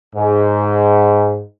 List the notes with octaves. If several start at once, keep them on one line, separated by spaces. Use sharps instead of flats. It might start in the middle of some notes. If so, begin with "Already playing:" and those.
G#2